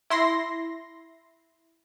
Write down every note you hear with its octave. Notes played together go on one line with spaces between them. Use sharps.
E4 C6 A#6